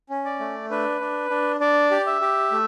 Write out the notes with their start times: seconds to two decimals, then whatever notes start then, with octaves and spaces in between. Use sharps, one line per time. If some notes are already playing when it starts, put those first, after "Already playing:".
0.09 C#4
0.25 D5
0.40 A3
0.70 D4 B4
1.01 D4
1.30 D4
1.60 D4 D5
1.91 G4
2.06 E5
2.21 G4
2.52 A3